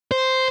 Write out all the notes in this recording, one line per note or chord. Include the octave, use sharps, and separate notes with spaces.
C5